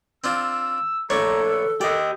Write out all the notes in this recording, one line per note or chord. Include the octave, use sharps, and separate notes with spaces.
C4 D4 F4 E6
A#1 A3 D4 A4 C#5 A#5
B4
G4 D5 D#5 E6